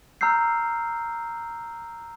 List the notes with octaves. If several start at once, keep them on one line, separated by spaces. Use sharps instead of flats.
A#5 E6 F6 G6 C7